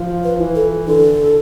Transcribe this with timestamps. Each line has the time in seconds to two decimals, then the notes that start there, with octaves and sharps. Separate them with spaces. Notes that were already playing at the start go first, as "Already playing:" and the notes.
Already playing: F3
0.24 B4
0.41 E3
0.55 A4
0.88 D3 A4